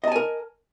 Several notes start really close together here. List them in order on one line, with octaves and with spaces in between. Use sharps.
D#5 A5 G#5 A#4